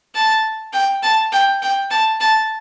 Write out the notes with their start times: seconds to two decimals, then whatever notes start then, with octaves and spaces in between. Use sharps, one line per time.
0.15 A5
0.73 G5
1.02 A5
1.32 G5
1.62 G5
1.91 A5
2.20 A5